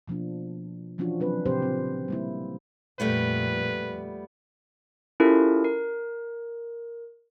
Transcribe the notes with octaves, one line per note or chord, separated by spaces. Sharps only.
B2 F3 A#3 D4
E3 F3 C#4 D4 F4 F#4
C3 F#3 C4 D4 B4
A#2 C#3 C4 G4 C5
C#3 C4
G3 A#3 E4
F2 A#2 G3 A3 B3 B4
C#4 E4 F4 G4 A4 A#4
A#4